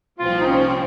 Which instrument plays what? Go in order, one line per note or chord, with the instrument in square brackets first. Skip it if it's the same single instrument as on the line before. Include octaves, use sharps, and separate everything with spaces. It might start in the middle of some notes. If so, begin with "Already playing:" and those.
[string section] C2 A#2 F3 C4 [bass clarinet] F4
[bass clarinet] D#4
C#4
C#4